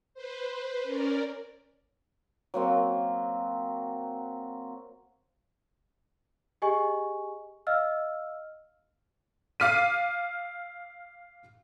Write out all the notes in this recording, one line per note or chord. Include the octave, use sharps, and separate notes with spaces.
B4 C5
C#4 A#4 D5
F#3 A#3 C4
G4 G#4 D#5 G#5 C#6
D#5 F5 E6 F6
F5 D6 F6 B6 D#7